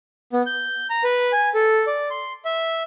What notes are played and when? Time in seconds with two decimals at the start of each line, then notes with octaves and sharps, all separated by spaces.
0.33 B3
0.46 G6
0.90 A#5
1.04 B4
1.32 G#5
1.54 A4
1.87 D5
2.10 C6
2.45 E5